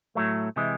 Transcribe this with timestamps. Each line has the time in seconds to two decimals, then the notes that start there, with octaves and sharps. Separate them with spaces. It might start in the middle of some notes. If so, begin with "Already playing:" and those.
0.15 A2 F#3 A3
0.56 C3 E3 G#3